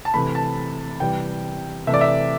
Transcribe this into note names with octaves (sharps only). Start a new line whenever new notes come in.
A5
C3 E3 A3 B5
A5
C3 E3 G3 G5
C3 E3 A3 E5
D5
E5